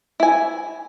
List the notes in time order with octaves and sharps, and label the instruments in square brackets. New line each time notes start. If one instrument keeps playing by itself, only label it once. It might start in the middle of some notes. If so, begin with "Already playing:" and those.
[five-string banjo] E4 G#5